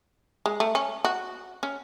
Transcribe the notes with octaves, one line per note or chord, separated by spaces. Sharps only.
G#3
A3
C#4
F#4
C#4